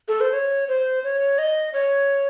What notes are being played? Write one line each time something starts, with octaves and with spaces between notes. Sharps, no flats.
A4
C5
C#5
C5
C#5
D#5
C#5